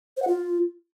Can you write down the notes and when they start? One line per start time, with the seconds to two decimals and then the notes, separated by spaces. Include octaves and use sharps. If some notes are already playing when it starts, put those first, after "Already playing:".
0.17 C5
0.22 F#5
0.28 F4